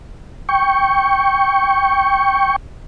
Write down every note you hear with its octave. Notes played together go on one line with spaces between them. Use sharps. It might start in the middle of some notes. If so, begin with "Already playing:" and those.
G5 C#6